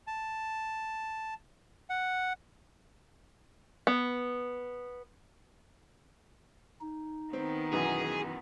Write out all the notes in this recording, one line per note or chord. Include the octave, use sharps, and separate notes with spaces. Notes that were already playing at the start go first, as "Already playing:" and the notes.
A5
F#5
B3
D#4
D#3 B3 C4
F#2 B2 E3 G#4